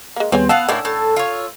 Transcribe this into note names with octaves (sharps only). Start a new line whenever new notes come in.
G#3 A#3
D#2 G3 B3 C4 G#4 C#5 G#5
B3 F5 F#5 A5 E6
A2 D3 A#3 C#4 E4
A2 A5
F4 C#5